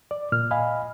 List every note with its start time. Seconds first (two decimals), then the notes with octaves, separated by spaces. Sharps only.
0.11 D5
0.32 A#2 F6
0.51 D#5 F5 G#5 B5